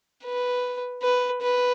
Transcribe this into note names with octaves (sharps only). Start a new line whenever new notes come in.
B4
B4
B4